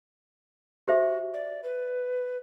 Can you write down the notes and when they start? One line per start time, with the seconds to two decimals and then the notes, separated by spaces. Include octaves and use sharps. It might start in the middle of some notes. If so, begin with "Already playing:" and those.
0.88 F#4 G4 C5 E5
1.34 D5
1.63 B4